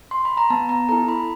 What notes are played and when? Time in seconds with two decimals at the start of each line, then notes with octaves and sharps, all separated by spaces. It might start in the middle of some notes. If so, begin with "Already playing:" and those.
0.11 C6
0.25 B5
0.37 A#5
0.50 B3 A5
0.69 A#5
0.89 E4 A4 A#5
1.08 B5